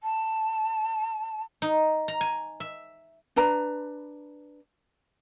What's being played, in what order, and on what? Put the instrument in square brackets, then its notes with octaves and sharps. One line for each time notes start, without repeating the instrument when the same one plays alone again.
[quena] A5
[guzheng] D#4
A#5
G#5
E5
[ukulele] D4 B4 A#5